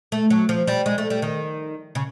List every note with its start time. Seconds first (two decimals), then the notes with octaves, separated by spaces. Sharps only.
0.12 A3
0.30 F#3
0.49 F3
0.67 G3
0.86 G#3
0.98 A3
1.10 G3
1.22 D#3
1.95 C#3